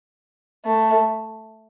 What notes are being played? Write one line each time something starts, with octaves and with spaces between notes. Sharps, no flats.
A3